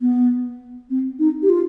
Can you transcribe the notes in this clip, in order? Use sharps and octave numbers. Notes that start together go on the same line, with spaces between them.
B3
C4
D#4
G4
F4